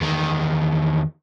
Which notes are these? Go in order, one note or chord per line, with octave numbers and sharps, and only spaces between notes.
E2 D#3